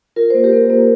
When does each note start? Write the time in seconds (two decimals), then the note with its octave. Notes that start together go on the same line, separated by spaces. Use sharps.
0.16 F4 A#4
0.30 A#3 C5
0.44 G4 A#4
0.53 A#3
0.70 A#3